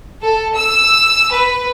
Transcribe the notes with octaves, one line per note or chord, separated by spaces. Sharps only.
A4
E6
B4